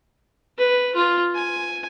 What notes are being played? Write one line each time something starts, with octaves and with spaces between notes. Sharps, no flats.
B4
F4
G#5